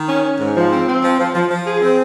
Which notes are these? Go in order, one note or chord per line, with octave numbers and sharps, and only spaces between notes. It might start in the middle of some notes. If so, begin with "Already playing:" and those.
Already playing: D#3
C#4
C#4
G#2
F3
C4
C4
F3
F3
F3
F3
G#4
C4